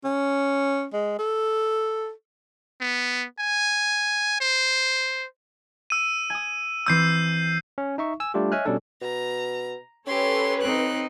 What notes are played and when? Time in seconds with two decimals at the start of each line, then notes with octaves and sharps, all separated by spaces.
0.04 C#4
0.93 G#3
1.19 A4
2.81 B3
3.39 G#5
4.40 C5
5.90 E6 D#7
6.30 G#5 D#6
6.87 E3 C4 D#6 E6 G6 C7
7.78 C#4
7.98 D#4 E5 C#6
8.20 G#5 E6
8.34 G3 A3 D4 F4 G4
8.52 C#5 D#5 E5 G#5 F6 F#6
8.65 B2 G3 C#4 D4 A4
9.02 B2 A#5
10.07 C#4 G4 A4 B4 C#5 C6
10.62 C4 D#4 F#6